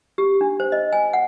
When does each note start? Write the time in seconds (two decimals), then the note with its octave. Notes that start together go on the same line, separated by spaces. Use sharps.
0.18 G4
0.41 D4
0.60 C5
0.72 D#5
0.93 G#5
1.13 F#5